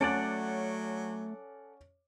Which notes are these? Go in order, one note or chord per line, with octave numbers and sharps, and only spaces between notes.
F#3 A3 C#4 A4 D5 F#5 D6 A6